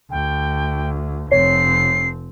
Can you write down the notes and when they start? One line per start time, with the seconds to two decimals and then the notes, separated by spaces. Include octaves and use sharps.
0.11 D2 G5
1.31 F1 C4 C#5 C7